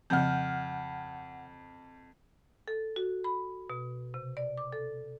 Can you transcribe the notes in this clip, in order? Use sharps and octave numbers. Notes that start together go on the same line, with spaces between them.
F2 C#3 F3 F#5 F6 G6
A4
F#4
B5
B2
C3
D5
D6
A4